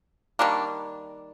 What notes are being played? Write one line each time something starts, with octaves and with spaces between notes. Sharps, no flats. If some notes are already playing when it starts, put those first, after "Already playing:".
D#3 G3 A#3 D4